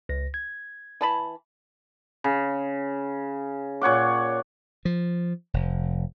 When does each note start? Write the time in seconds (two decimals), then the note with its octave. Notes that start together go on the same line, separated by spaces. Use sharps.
0.09 C#2 A#6
0.34 G#6
1.01 E3 A5 B5
2.24 C#3
3.81 A#2 C#5 F#5 D6
4.85 F3
5.54 F1